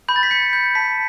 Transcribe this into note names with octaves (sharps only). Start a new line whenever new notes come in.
B5 G6
A6
B6
G6 C#7
G6
A5 B6